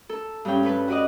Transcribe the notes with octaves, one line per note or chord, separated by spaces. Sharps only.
A4
G2 G3 C#4 G5
G3 A4 B4
F#4 B4 D5 D#5